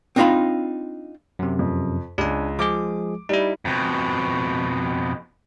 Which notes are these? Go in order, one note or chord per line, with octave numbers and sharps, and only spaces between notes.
C4 D4 D#4 F4 F5 B5
F#2 C3
F2
C#2 D4 G#5
F3 G#3 G#4 D6
G3 D#4 E4
F2 B2